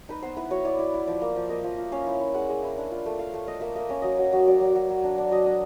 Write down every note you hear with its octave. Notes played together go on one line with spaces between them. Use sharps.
D#4 B4
B3 C5
E4 B4
F#3 C#5
E4 D5
E4
E4
F3 D5
A#3
F3
A#3 D#5
F3
F4
C#4 F5
E4
E4
G#3 F#5
G#3
E4
D4
F4
A3
F4 F5
A3
A3 D#5
A#3 E5
A#3 D#5
C#4 E5
F#3 D#5
F#3
F#3
F#3 D5
F#3
F#3
F#3
D4
D4
F#3 D#5
D4